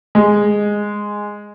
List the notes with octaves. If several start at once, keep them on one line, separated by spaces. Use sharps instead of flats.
G#3